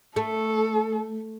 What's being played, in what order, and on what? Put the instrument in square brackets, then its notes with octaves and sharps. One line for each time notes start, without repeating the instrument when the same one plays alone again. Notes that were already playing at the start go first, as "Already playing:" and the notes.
[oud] A3 [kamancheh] A4